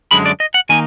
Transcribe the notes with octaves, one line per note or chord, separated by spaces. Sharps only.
F#2 D3 G#3 B5
D5
D#5
F#5
D#3 A#3 D#4 G#5